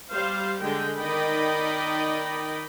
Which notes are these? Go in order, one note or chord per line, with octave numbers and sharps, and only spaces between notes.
G3 C5 F5
D3 G#3 G5
D#3 D#4 D5 D#5 G5 B5